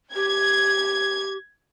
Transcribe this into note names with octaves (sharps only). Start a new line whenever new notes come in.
G4 G#6